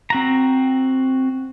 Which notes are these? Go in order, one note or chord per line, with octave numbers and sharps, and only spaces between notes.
C4 F#4 A#5